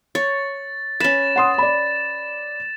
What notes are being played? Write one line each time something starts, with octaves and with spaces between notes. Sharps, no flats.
C#5 A6
C#4 B4 A6 E7
F#5 C6 D#6
D5 B5